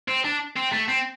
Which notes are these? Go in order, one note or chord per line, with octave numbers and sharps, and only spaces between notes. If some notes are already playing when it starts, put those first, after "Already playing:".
C4
D4
C4
A3
C4